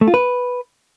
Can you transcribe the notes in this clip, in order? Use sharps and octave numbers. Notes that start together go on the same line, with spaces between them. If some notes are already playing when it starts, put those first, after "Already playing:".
A3
F4
B4